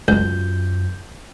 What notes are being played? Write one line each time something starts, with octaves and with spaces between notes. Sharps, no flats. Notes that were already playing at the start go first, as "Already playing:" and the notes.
C#2 F#2 F4 G6